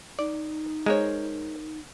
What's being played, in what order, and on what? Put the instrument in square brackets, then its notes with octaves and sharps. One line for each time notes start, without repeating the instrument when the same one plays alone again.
[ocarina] D#4 [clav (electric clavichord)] D5
[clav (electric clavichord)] G#3 [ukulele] A#4 C5 C#5